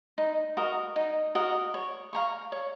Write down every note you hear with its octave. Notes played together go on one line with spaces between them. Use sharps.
D#4
F#4 A#4 D#5
D#4
F#4 A#4 D#5
C#5
F5 A#5 C#6
C#5